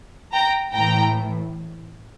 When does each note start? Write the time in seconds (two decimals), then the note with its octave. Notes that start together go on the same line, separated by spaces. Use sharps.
0.33 G5 A#5
0.74 A2 E3 G5 A#5